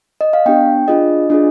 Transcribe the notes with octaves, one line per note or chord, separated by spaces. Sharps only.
D#5
F5
B3 D4 G4 G5
D4 F4 G#4 D#5
D4 F4 G#4